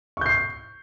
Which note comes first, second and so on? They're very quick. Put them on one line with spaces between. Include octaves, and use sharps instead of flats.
C#6 G6 C7